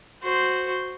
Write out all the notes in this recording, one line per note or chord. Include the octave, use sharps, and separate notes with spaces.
F#4 C5